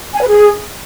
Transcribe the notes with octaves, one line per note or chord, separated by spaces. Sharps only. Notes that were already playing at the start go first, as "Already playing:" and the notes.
G#5
B4
G#4